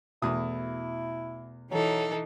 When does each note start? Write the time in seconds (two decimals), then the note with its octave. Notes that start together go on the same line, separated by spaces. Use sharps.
0.22 E2 B2 A3 E4 D#6
1.71 E3 F#3 D#4 A4